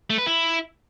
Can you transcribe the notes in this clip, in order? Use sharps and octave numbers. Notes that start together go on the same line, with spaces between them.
A3
B4
E4